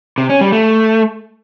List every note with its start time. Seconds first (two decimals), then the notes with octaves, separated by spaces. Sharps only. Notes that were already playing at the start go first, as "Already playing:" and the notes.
0.18 C3
0.29 C#4
0.41 G3
0.53 A3